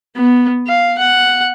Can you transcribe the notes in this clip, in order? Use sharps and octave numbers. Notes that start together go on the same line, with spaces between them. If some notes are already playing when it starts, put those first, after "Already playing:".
B3
F5
F#5